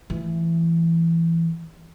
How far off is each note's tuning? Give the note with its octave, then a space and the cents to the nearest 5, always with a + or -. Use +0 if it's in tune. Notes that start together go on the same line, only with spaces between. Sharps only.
E3 +15 A3 +0